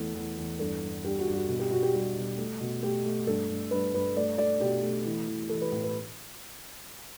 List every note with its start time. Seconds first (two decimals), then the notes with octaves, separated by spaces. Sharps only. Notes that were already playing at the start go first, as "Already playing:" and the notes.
Already playing: E2 A3 A4
0.15 E2
0.38 E2
0.59 G2 A4
0.82 G2
1.04 G2 G4
1.19 F#4
1.26 G2
1.33 F#4
1.48 B2
1.59 G4
1.71 B2 F#4
1.83 G4
1.93 G3 G4
2.16 B2
2.38 A3
2.60 B2
2.83 A3 G4
3.05 A3
3.27 G2 A4
3.49 G2
3.71 G2 B4
3.94 G2 B4
4.17 A3 D5
4.38 A3 D5
4.60 B2 G4
4.83 A3
5.05 E3
5.27 E3
5.49 E3 A4
5.61 B4
5.72 A2
5.84 B4